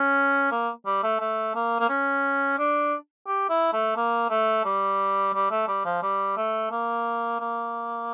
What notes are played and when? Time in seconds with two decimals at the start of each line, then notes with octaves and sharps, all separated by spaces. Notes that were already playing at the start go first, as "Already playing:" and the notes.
Already playing: C#4
0.51 A#3
0.86 G3
1.03 A3
1.20 A3
1.55 A#3
1.80 A#3
1.89 C#4
2.58 D4
3.27 G4
3.49 E4
3.73 A3
3.97 A#3
4.30 A3
4.65 G3
5.34 G3
5.51 A3
5.68 G3
5.85 F3
6.03 G3
6.37 A3
6.71 A#3
7.40 A#3